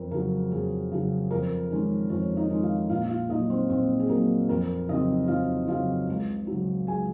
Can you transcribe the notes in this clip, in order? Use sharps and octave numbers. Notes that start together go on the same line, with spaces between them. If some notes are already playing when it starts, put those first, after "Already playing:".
Already playing: F2 A#4
C#3 F#3 A#4
F2 G#4
C#3 F#3
F2 A#4
D#3 G#3 C#4
F2 C#4 C#5
D#4 D#5
D#3 G#3 C#4
F4 F5
A#1 F4 F5
F4 F5
A#2 F#3 D#4 D#5
C4 C5
A#1 C4 C5
G#4
A#2 F#3 A#4
F2 A#4
C#3 F#3 C4 D#4 D#5
F2 F4 F5
C#3 F#3 C4 F4 F5
C#2
C#3 F#3
C#2 G#4 G#5